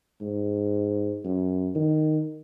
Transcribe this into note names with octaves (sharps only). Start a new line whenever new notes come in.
G#2
F#2
D#3